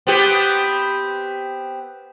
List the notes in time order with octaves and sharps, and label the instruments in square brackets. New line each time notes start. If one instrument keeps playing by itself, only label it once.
[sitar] B3 C4 G4